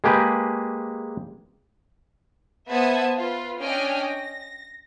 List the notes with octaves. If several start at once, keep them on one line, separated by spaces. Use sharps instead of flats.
G#3 A#3 G4 G#4 B4
B3 C5 E5 A5 D#6 G#6
F4 B4
C#4 D4 D#5 G5 G#5 F6
A#6